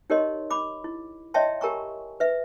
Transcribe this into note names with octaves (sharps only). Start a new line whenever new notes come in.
D#4 G4 A#4 C#5 D#5 C6
B5 D6
E4
C#5 D#5 E5 G5 A5 C6
G4 A#4 G#5 A#5 C#6
B4 E5